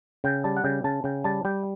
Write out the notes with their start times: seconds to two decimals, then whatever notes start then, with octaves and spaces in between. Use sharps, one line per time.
0.24 C#3 G5
0.44 G3 A5
0.57 F#5
0.64 C#3 G5
0.84 C#3 A5
1.04 C#3 G5
1.24 G3 A5
1.45 G3 G5